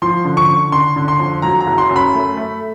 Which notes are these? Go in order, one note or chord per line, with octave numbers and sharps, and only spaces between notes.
F3 C6
D3
C#6
D3
D3 C6
D3
C6
F2
F#3 A#5
A#5
F#1
C6
F#2
B5
A3
A3